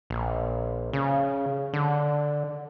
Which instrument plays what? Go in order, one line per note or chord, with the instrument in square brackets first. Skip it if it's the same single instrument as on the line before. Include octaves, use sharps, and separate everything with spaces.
[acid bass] A#1
C#3
D3